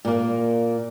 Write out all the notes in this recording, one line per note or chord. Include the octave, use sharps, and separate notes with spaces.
A#2 A#3